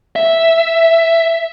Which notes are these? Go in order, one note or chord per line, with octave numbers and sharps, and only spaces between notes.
E5